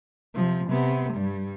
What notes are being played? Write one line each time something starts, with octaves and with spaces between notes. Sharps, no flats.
C3 F3
C3 B3
G2 G3